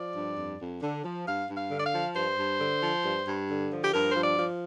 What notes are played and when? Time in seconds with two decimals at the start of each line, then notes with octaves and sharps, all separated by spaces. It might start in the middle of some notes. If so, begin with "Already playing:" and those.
Already playing: F3 D5
0.15 G2
0.37 F2
0.60 F2
0.81 D3
1.04 F3
1.26 G2 F5
1.48 G2
1.56 F5
1.70 D3
1.79 D5
1.86 F5
1.93 F3
2.15 G2 C5
2.37 G2
2.59 D3
2.82 F3
3.03 G2
3.26 G2
3.49 D3
3.71 F3
3.83 G4
3.93 G2 A#4
4.11 F3 C5
4.23 D5
4.38 F3